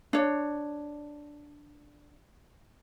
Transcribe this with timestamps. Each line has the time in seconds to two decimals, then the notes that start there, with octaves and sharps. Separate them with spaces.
0.13 D4 C#5